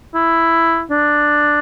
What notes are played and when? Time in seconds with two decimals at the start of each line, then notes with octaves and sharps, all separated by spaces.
0.14 E4
0.91 D4